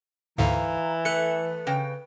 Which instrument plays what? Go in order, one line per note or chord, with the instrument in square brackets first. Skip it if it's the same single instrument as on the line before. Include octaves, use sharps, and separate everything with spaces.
[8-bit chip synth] D2 G#2 D3 [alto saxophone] E3 [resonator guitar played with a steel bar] F5 [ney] A#5
[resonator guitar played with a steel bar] A3 [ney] B4 [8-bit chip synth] F#6 C#7
[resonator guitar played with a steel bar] C#3 G5